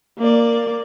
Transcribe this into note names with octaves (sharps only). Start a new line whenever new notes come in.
A#3 D5